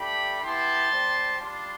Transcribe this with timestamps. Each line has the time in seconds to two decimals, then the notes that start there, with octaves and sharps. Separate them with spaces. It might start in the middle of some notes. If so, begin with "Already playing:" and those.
Already playing: A3 D4 G4 G5 B5
0.40 B3 E4 G4 A5 C6
0.90 G3 C4 G4
1.39 G3 D4 F4 A5 C6